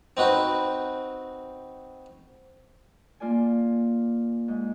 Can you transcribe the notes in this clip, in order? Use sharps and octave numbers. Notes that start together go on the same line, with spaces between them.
C4 D#4 F#4 B4
A#3 F4 D5 G#5
G#2